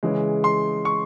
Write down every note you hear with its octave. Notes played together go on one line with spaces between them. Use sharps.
C#3 E3 G#3
C6
C#6